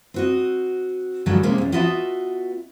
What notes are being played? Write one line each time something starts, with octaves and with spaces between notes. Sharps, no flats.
C4 F#4 D#5
G2 D3 F#3 G#3 A4
C3 G#3 A#3 C4 C#4
F#2 A#2
B3 F4 F#4 D#5 E5 A5